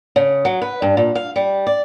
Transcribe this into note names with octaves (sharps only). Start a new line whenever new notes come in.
C#3
F#3
B4
G2
A#2
F5
G3
D5